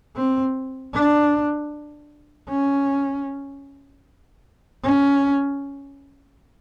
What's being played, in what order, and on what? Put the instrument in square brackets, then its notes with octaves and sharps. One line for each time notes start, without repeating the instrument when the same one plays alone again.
[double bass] C4
D4
C#4
C#4